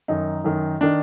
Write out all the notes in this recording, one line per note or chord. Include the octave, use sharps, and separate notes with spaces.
F#2 D#3 D#4
F#2 D#3
D#3 D4